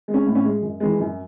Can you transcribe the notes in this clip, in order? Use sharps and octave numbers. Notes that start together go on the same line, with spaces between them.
G#3
C#4
A2
C#4
G#3
F#2
E3 G#3
F#2